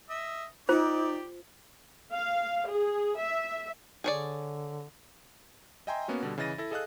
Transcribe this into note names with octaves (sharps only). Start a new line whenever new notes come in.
D#5 E5
D#4 F4 G4 C5 D5
F5
G#4
E5
D3 G#4 C#5 D5
D#5 E5 G5 G#5 A#5 C6
A#3 B3 C#4 F#4
B2 D3 G3
C#3 E3 D#5 A6 A#6 D#7
E4 A4 A#6
G#4 A4 D#5 F5 D#6 F#6